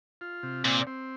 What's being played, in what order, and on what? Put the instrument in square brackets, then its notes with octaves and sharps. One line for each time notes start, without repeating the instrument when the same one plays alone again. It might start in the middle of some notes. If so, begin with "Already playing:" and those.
[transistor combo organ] F4
C3
[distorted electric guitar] A#2 [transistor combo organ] C4
[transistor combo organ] C4